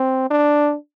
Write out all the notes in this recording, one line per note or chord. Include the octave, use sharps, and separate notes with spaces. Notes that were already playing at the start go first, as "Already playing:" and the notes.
Already playing: C4
D4